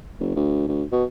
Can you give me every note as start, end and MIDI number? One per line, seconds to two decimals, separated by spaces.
0.20 0.33 30
0.36 0.67 38
0.68 0.83 38
0.92 1.04 47